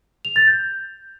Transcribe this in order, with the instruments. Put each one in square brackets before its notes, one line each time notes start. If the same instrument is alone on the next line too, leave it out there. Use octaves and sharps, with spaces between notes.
[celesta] F7
A6
G6